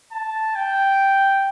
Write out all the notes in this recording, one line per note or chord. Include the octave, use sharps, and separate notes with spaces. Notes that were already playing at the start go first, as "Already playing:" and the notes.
A5
G5